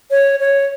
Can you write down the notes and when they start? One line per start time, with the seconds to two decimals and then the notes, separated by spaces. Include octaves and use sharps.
0.11 C#5
0.40 C#5